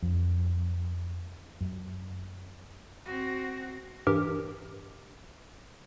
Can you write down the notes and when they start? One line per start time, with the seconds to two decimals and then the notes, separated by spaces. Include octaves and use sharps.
0.02 F2
1.61 F#2
3.05 C4 F#4
4.07 G2 E3 G4 A#4